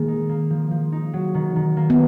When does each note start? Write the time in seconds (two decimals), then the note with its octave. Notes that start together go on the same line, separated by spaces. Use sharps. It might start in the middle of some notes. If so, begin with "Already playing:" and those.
Already playing: D#3 G#3 A#3
0.08 D#4
0.29 A#3
0.50 F3
0.71 F3
0.92 D#4
1.13 F#3
1.35 D#3
1.56 D#3
1.77 A#3
1.90 B3